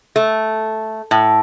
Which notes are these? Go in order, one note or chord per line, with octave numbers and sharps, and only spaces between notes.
A3
A2